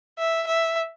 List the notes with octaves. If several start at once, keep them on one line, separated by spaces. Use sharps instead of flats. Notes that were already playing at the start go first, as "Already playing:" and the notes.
E5
E5